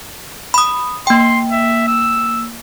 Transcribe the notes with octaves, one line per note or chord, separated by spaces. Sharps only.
B5 D#6
A#3 G5 C6
E5
E6